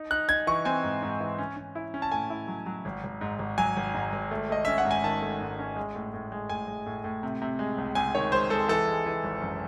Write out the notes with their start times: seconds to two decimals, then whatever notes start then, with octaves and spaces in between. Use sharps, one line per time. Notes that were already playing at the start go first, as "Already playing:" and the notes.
Already playing: D#4
0.11 D#4 F#6
0.29 D#4 G#6
0.47 E3 C#6
0.65 C4 G#5
0.83 G#2
1.03 G#2
1.20 E3
1.38 C#4
1.57 C#4
1.75 E4
1.94 C#4
2.02 A5
2.12 A2 G#5
2.30 E4
2.48 F#3
2.66 F#3
2.85 G#1
3.04 G#1
3.21 G#2
3.39 G#1
3.58 F#3 G#5
3.77 G#1
3.94 G#2
4.13 G#1
4.31 A3
4.50 A3 D#5
4.65 C#4 E5
4.78 F#5
4.85 G#2
4.91 G#5
5.04 D#3 A5
5.22 A3
5.40 G#2
5.59 C#4
5.77 G#3
5.95 A2
6.14 A2
6.32 G#3
6.50 A2 G#5
6.68 G#3
6.86 A2
7.04 A2
7.23 C3
7.42 C3
7.59 G#3
7.78 C#2
7.95 C#2 G#5
8.15 D#3 C#5
8.32 G#3 C5
8.50 G#3 A4
8.69 E3 A4
8.87 G#3
9.06 E3
9.24 G#1
9.41 F#2